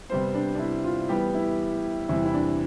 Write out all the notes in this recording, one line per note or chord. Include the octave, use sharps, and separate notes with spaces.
C3 G3 B3 C5
D4
D4
E4
F4
A2 E3 G3 B3 G4
E4
E2 C3 G3 E4
E4
D4